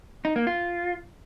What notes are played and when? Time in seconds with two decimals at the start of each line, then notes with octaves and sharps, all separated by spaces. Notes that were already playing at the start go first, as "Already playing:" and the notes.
0.25 D#4
0.36 A#3
0.47 F4